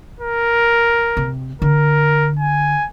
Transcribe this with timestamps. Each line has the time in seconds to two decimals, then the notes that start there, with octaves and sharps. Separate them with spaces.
0.20 A#4
1.17 C3
1.62 D3 A#4
2.39 G#5